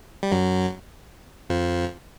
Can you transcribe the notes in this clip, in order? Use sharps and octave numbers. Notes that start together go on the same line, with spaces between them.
G3
F#2 F#3
F2 F3